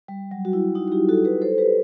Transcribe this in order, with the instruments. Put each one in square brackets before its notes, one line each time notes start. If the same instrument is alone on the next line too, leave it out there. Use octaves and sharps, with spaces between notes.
[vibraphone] G3
F#3
F#4
E4
D#4 F#4
F#4
E4 G4
F#4 A4
G4 B4
A4 C5
G4 B4